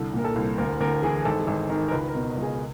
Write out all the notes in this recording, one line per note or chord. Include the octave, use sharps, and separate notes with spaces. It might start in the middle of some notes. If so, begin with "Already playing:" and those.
Already playing: C2 D3 A4
A#2 A#4
A4
C2
D2 A#4
D2 A#4
E3 G#4
G#1 A4
G#4
G#1 A4
D#3 A#4
A#4
C#2 B4
A#4
B2
C#2
G#4
A#4